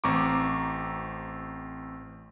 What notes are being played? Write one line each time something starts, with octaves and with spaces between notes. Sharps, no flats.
A1 C4 A#5 C#6 D6